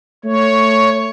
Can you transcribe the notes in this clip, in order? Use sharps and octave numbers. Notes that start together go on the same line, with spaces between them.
A3 C#5